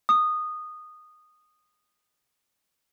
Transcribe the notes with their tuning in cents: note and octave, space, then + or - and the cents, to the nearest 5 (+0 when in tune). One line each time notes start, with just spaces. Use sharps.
D#6 -15